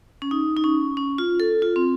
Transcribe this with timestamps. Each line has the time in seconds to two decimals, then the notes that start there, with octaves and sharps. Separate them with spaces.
0.22 C#4
0.31 D#4
0.57 D#4
0.64 C#4
0.97 C#4
1.18 F4
1.40 A4
1.62 F4
1.76 C4